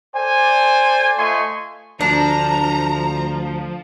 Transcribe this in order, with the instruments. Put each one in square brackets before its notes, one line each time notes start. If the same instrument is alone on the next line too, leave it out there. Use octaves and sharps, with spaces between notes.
[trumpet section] A4 C5 D5 G#5
A3 F4 D#5 G#5 C6 C#6
[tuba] D2 [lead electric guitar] F3 [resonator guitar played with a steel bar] D4 [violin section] A#5